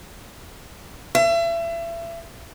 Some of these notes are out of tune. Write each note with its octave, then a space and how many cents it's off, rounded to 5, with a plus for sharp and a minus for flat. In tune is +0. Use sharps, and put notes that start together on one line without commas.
E5 +35